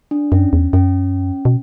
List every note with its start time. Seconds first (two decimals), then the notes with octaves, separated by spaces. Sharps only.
0.11 D4
0.32 F#2 C#4
0.53 E2
0.73 F#2 C#4
1.45 B2